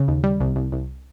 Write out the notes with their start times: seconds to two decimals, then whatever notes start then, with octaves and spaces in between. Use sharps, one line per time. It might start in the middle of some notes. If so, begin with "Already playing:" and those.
Already playing: C#3
0.08 D#2
0.24 G3
0.40 C2
0.56 C2
0.72 C2